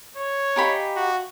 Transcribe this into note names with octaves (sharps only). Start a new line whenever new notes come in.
C#5
D#4 G4 D#5 F5 G#5 B5
F#4